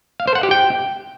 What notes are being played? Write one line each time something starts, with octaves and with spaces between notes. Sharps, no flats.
F5
C5
F#5
G4
G5